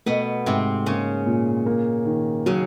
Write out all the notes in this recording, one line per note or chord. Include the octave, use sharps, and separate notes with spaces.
B2 A3 B3
G#2 C3 C4
C#3 A#3 C#4
A#2
A#3
D#3
C#3 F#3 C#4